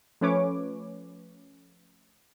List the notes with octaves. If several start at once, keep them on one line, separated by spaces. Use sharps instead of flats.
F3 A3 C#4 B4 C#5 D6